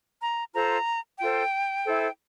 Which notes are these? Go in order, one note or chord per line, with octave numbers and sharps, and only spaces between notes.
A#5
F4 A4 C5 A#5
F4 A4 C5 G5
E4 A4 C5